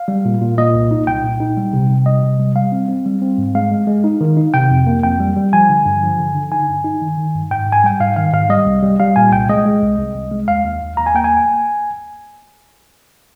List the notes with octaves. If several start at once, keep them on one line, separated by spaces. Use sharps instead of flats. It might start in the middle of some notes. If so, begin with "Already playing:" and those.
Already playing: F5
G3
A#2
A#2
A#2 D#5
C2
D#4
C2 G5
A#2
D#4
G3
C3
C3
G3 D#5
C3
G3
G3 F5
C4
C4
G3
C4
G#2
G#3 F5
G#3
G#3
D#4
D#3
D#4
C3 G5
F2
A#3
F2 G5
G3
G3
F3 G#5
D3
G2
F3
D3
D3
D#4 G#5
G2
D#4
D#3
D#3
G2
G#2 G5
G#2
G#5
G3 G5
G#2 F5
D#3 F5
G#2 F5
G3 D#5
C2
G3
G3 F5
A#2 G#5
C2 G5
G#3 D#5
G#3
C2
C2
C2
G#3
D#2 F5
D#2
D#2
D#2 A#5
G#5
A#3 G5
G#5